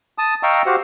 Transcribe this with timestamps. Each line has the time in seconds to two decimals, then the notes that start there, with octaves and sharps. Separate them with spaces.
0.18 A5 D#6
0.43 D#5 F5 G5 A#5 C#6 E6
0.66 F#4 G4 C5 F5 F#5